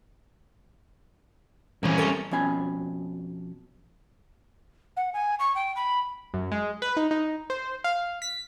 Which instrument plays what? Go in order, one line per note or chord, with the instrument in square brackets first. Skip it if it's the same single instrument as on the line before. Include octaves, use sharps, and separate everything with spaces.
[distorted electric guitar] C2 C#4 [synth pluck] A#2 E3
[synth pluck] A4 A#4
[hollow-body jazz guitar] F2 B2 C#4 G#5 B5
[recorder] F#5
G#5
C#6
G5
B5
[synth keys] F#2
G#3
B4
D#4
D#4
C5
F5
B6